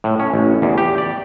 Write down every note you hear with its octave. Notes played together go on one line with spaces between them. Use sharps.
A2
C#4
A1
E2
G4
D5